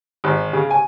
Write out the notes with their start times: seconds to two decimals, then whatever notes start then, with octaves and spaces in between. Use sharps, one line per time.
0.24 G#1
0.53 C#3
0.71 G#5